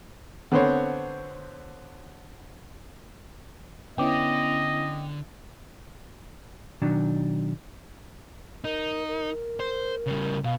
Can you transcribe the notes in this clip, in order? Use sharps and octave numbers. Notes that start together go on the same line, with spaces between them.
D3 B3 C4 C5 C#5
D3 B3 C#4 E4 D#5 G5 D6
B2 D#3 F#3 D4
D#4 A#4
A#4
C5
C#3 G3
B2 F5